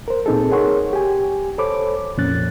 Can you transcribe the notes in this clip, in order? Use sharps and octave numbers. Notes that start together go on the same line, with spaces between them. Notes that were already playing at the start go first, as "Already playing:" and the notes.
A#4 C5
A#2 C4 D#4 G#4 A4
G#4 A#4 C#5 F#5 C6 C#6
G4 G#5
A4 C5 C#5 B5 D6
C2 F2 A#2 C#4 F#6 A6